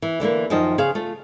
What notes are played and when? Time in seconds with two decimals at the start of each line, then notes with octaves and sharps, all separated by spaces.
0.02 E3
0.20 D3 E3 G#3 A#3
0.50 F#2 D#3 F3 C5 D#5
0.78 C#3 G#4 C5 F5
0.95 A3 F4